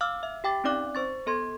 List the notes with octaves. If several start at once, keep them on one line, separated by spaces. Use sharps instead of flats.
F5 D6 E6 F6
E5
G4 G5 D6 A6
C4 C#4 D#4 D5 D6 F#6
C5 C#6 A6
B3 A4 C6 G#6